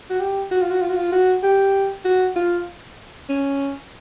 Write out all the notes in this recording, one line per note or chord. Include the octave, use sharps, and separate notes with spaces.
F#4
G4
F#4
F4
F#4
F4
F#4
F4
F#4
G4
F#4
F4
C#4